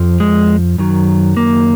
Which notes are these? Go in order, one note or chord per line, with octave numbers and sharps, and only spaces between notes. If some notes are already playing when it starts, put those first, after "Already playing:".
Already playing: F2 F3
G#3
F#2 D#3 F#3
A#3